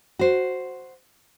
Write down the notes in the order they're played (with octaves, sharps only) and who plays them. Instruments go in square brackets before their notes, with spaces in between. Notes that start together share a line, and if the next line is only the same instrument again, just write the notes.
[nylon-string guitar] F#4 C5